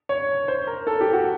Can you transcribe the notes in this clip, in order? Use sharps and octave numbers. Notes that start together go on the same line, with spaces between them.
C#5
C5
A#4
A4
G4
F#4